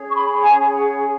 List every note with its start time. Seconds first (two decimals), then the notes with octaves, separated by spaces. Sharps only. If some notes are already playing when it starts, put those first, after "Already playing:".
Already playing: C#4 G#4 C#5
0.09 C#6
0.14 B5
0.43 G#5
0.72 F#5